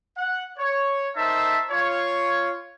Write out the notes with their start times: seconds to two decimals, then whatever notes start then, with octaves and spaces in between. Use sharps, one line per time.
0.17 F#5
0.59 C#5
1.16 D#4 A#4 C5 E5 A5
1.71 F4 C#5